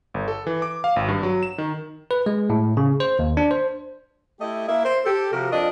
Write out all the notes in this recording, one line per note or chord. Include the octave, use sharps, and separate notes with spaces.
G1
A4
E3
D6
F5
G#1
G2
F#3
E7
D#3
B4
G#3
A2
C#3
C5
D#2
D4
C5
A3 E4 G4 D#5
A#3 E4 E5
C5
G4 A4
C3 F3 F#4 A#4
F2 D4 D#5